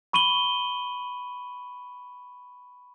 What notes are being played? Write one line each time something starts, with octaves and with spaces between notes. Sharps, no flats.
B5 C#6 D#7 F#7 G7